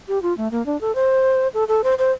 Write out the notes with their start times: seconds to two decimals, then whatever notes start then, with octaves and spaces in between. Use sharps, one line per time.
0.08 G4
0.22 F4
0.37 A3
0.51 A#3
0.66 D4
0.81 A4
0.95 C5
1.54 A4
1.68 A4
1.84 C5
1.98 C5